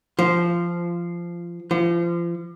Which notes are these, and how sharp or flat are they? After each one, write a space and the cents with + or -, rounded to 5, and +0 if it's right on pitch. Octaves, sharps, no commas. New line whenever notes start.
F3 -15
F3 -35